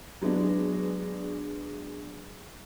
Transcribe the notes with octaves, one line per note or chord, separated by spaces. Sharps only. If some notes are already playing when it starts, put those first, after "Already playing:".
F#3 G#3 B3 D4